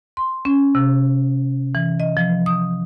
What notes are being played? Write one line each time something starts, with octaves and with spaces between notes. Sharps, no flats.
C6
C#4
C3
E3
D#5
F3
D#6